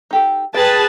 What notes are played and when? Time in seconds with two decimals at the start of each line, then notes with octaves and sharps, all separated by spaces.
0.11 D#4 G4 A4
0.54 G#4 B4 G5 A5